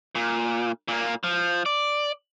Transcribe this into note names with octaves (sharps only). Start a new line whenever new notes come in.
A#2
A#2 A#3
F3
D5